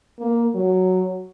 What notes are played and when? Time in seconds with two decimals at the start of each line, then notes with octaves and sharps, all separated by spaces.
0.19 A#3
0.54 F#3